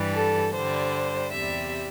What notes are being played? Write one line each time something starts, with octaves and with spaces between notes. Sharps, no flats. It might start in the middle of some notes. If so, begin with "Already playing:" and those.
Already playing: G2 E3 G3
A4
G2 D3 G3 C5
E2 C3 G3 E5